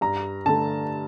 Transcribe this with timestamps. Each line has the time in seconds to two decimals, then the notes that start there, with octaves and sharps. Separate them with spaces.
0.01 G2 A#5
0.46 D3 A3 A5